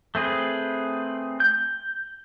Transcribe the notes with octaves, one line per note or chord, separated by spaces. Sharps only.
A3 C4 G#4 B4
G6